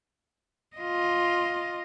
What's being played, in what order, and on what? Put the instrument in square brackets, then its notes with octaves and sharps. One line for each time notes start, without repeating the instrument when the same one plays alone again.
[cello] F4 D#5